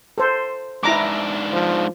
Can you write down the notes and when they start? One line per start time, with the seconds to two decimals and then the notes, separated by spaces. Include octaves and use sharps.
0.18 A4 C5
0.83 G#2 D4 E4 A#5 D6
1.53 F3